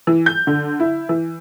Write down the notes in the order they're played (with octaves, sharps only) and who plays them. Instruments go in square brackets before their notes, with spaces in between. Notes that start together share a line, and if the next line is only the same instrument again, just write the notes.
[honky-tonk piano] E3
G6
D3
E4
E3